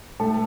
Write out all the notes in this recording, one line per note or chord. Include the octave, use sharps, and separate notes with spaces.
B2 A3 A4